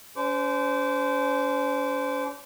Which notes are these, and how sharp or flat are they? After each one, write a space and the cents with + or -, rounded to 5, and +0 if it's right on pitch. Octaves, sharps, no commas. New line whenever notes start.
C#4 +40 C5 -25 D6 -30